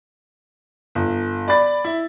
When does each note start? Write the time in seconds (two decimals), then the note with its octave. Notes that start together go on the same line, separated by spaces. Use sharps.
0.95 G1
1.48 D5 B5 A6
1.84 E4